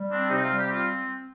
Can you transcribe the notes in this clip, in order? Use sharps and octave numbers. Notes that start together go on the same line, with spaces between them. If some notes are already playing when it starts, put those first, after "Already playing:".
Already playing: G3
C4 D4
C3 D#4
F4
G3
G4
C4 F4